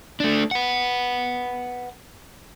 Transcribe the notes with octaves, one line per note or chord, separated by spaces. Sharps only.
A3 D4
B4 F#5